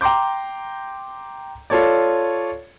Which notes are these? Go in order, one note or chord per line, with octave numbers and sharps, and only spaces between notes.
G5 A#5 C6 D6 G6
F4 A4 C#5 D5